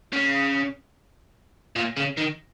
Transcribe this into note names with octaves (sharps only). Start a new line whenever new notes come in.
C#3
A#2
C#3
D#3